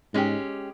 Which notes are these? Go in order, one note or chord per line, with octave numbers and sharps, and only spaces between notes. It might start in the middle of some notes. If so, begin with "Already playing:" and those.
G#2 G#3 C#4 G4